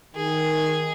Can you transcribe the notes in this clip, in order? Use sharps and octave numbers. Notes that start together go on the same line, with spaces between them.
D#3 G#4